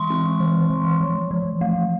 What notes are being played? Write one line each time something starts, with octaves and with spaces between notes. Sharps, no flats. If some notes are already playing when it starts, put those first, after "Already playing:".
Already playing: E3 G#3 C6 C#6
C4
E3
E3
F3
F3
A3